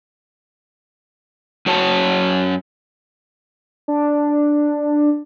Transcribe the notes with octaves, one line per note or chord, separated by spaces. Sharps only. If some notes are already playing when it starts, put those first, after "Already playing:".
F#2 F#4 C#5 A5
D4